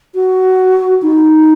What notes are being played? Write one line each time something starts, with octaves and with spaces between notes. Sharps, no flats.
F#4
D#4